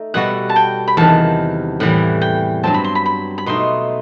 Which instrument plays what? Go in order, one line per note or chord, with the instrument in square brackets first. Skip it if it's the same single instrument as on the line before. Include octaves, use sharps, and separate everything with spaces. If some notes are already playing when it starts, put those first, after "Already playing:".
Already playing: [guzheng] A3 D#4
[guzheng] B2 G3 B3 F#4 A4 [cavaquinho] F#5
[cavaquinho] A5
G5
B5
[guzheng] E2 C3 D#3 [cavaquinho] A5
[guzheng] A2 E3 G3 [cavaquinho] F#5
[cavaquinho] G5
[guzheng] G2 F#3 C4 [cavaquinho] A5
[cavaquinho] B5
C6
B5
B5
B5
[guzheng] B2 A3 D#4 [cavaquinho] C6